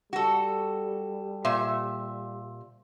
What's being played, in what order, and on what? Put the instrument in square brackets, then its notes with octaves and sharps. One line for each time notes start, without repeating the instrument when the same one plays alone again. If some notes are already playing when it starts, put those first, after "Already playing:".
[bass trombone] G3 [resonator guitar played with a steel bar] F#4 A4
[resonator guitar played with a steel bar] A#2 C5 E5